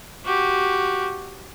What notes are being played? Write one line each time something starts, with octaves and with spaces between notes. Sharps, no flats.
F#4 G4